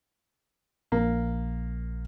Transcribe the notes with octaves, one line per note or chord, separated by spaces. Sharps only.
A#1 A#3